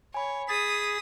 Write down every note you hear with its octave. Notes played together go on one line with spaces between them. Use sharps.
C#5 G#5 B5
G#4 D#6 A6 B6